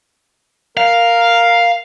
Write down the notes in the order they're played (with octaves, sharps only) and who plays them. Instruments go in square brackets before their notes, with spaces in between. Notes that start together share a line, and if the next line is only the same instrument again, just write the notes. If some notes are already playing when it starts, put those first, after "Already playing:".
[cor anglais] A#4 [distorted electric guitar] F5